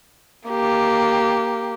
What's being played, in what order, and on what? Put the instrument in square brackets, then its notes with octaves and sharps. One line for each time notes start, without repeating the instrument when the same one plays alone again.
[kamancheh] A#3 G4